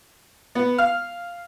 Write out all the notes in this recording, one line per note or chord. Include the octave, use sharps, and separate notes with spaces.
B3
F5